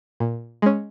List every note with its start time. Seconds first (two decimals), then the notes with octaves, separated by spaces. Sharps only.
0.20 A#2
0.62 G#3 C#4